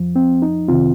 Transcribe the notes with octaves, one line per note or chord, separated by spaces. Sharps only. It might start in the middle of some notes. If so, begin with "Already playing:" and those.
Already playing: F2 F3
C4
D#4
F2 C3 D#3 C4 F4